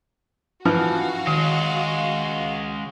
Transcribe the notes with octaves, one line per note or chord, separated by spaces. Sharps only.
E3 F3 F#4 F5 F6
D#3 G#3 C#4